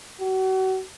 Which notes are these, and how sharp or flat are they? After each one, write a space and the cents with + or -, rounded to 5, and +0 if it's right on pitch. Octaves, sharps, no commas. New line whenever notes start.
F#4 +35